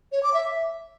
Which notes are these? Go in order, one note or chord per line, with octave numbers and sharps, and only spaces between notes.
C#5
D6
E5